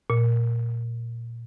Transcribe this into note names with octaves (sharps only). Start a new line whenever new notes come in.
A#2